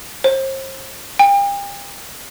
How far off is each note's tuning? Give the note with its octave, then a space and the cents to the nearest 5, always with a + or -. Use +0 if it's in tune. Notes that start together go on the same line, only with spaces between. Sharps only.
C5 +35
G5 +40